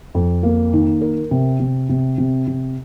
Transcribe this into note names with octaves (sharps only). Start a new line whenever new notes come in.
F2
A#3
D#3
A#4
C3
C3
C3
C3
C3